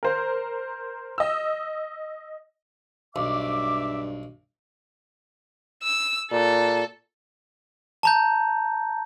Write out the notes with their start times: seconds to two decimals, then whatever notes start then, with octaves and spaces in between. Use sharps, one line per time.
0.03 A#4 C5
1.18 D#5 E6
3.16 B1 G2 E5 D6
5.83 E6
6.31 A#2 A4
8.03 A5 A#5 G6